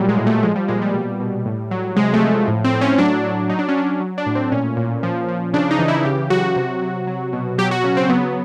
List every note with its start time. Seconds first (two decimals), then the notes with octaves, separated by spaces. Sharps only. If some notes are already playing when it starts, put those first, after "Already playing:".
Already playing: A#2 F#3 G3
0.09 G#3
0.18 A2
0.26 A3
0.43 F3 G#3
0.56 G3
0.68 A#2 G#3
0.81 G3
0.94 B2
1.20 B2
1.46 A2
1.71 F#3
1.96 C3 G#3
2.13 A3
2.22 F3
2.48 A2
2.64 C4
2.73 A2
2.81 C#4
2.98 F#3 D4
3.24 F#3
3.49 F#3 D#4
3.59 D4
3.69 C#4
3.75 F#3 D4
4.00 F#3
4.18 D4
4.26 A2
4.35 C4
4.52 A#2 C#4
4.77 A#2
5.03 F3
5.28 F3
5.53 C#3 D4
5.71 D#4
5.79 E3
5.88 E4
6.05 C#3 G4
6.30 F#3 F#4
6.56 C3
6.82 F#3
7.07 F#3
7.33 B2
7.58 F#3 G4
7.71 F#4
7.84 C#3 C#4
7.97 C4
8.09 F#3 B3